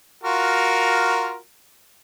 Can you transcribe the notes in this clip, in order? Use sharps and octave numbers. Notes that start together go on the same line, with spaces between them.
F4 F#4 A#4